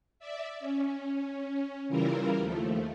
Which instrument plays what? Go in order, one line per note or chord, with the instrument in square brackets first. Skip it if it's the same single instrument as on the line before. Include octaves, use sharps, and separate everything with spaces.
[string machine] D5 E5
C#4
C#3 E3 G3 E4 F4 A#4
D#2 F3 A3